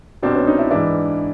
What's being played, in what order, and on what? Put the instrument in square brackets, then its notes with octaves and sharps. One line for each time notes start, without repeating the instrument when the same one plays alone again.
[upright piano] C2 B2 C4 D4
B3 C#4
C#4 D#4
D4 E4
G#2 E3 D4 E4